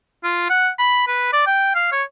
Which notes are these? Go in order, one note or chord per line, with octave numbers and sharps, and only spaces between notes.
F4
F#5
B5
B4
D5
G5
F5
C#5